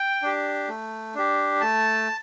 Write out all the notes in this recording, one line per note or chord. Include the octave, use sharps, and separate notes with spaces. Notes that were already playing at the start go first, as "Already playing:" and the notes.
Already playing: G5
D4 G4
A3
D4 G4
A3 A5